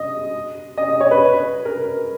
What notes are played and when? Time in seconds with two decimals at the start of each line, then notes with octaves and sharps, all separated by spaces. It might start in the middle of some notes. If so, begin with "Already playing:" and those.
Already playing: D#5
0.78 D#5
0.89 D#5
1.00 C#5
1.11 B4
1.65 A#4